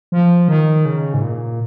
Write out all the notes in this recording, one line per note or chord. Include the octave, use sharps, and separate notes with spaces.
F3
D#3
C#3
G#2
A#2